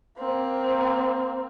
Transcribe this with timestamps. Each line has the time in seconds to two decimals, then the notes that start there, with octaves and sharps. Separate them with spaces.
0.18 A#3 C4